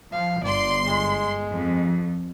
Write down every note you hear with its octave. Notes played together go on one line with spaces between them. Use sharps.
F3 F5
G1 D5 C6
G#3
F2